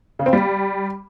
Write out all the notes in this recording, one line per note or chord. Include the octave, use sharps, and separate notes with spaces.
C#3
C4
G3